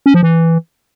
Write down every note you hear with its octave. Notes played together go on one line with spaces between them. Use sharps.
C#4
F3
E3